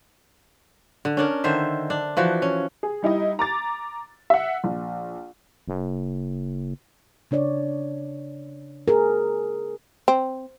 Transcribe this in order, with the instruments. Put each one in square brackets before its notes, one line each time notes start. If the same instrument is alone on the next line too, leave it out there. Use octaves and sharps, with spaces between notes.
[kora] D3
C#4 D4 A#4
D3 D#3 C5 E5
D4
E3 F3 F#4
C#4
[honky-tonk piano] G#4
G3 D#4 E4 D#5
A#5 D6 A6
E5 F#5
A#1
[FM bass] F#1
[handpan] C#3 D4 C#5 D5
G#4 A#4
[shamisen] C4